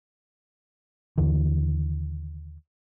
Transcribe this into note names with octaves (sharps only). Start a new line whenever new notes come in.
D#2 D3 E3